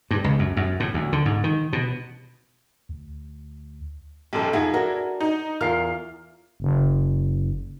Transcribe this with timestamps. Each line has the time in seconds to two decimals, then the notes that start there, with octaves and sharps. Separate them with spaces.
0.11 G2
0.24 C#2
0.39 F#2
0.57 F#2
0.80 A2
0.94 D2
1.12 D3
1.26 G#2
1.44 D#3
1.73 B2
2.89 D2
4.33 B1 F#2 G4 A4
4.53 F2 D#4 E4 G#4 F#5
4.74 D4 F#4 A#4
5.21 D#4
5.61 E2 F4 A#4 F6 C7
6.60 F#1